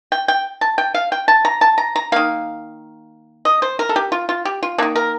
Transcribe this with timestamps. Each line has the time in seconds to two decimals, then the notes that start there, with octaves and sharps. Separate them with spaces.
0.12 G5
0.28 G5
0.61 A5
0.78 G5
0.94 F5
1.12 G5
1.28 A5
1.45 A#5
1.61 A5
1.78 A#5
1.96 A#5
2.12 D#3 A#3 F5
3.45 D#5
3.62 C5
3.79 A#4
3.89 A4
3.96 G4
4.12 F4
4.29 F4
4.45 G4
4.63 F4
4.78 D#3 A#3 D4
4.96 A#4